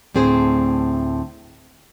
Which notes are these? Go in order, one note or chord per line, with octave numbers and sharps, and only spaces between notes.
D2 A2 C4 G#4 C5